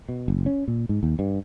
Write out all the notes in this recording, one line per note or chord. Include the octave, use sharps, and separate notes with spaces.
B2
F#1
C#4
A#2
G#2
D#2
G2